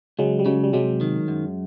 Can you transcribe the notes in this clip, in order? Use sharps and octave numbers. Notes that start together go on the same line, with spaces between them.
C#2 F#3 G#3
G3
C#3 F#3 G#3
G3
C3 F#3 G#3
D#3
F#2